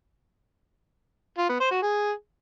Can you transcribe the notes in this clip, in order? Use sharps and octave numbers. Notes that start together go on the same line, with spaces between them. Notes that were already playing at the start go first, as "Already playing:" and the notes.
F4
B3
C5
F#4
G#4